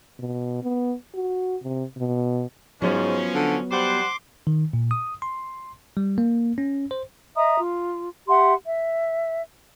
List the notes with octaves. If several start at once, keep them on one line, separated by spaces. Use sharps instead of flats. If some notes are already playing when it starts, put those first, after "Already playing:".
B2
B3
F#4
C3
B2
G#2 F3 F#3 B3 C#4
D3
G3 C5 F#5 C6 D6
D#3
A#2
D#6
C6
G3
A#3
C#4
C5
D#5 E5 A#5 D#6
F4
G4 E5 F#5 C6
E5